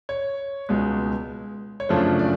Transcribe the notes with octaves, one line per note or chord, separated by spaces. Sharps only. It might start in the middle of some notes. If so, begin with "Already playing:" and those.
C#5
C#2 B2 G#3
C#5
F#2 C#3 F3 A3 D4 C5
D5